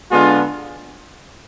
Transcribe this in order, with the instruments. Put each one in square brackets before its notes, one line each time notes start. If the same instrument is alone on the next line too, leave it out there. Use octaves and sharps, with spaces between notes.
[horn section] D3 G#3 B3 D4 F4